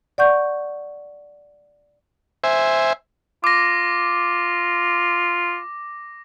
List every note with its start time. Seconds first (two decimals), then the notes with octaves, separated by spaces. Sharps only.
0.18 D5 F#5 C#6 G6
2.44 C5 E5 G#5
3.44 F4 D6 A#6